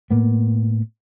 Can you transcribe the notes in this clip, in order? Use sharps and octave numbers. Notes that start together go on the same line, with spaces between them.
A2 A#3 B3